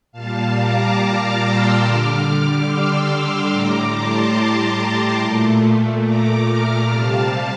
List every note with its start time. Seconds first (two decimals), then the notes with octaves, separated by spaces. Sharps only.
0.12 A#2 G3 F5 A5
0.55 A#5 D6
0.96 D6 F6
1.39 C6 E6
1.81 D3 G3 D6 F6
2.23 D6 F6
2.65 C6 E6
3.08 C6 E6
3.50 A2 G3 A#5 D6
3.92 A5 C6
5.18 A#2 A3
6.03 A#5 D6
6.45 D6 F6
6.87 C3 G3 F5 A5